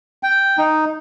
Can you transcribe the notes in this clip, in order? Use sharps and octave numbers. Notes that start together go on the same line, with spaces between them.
G5
D#4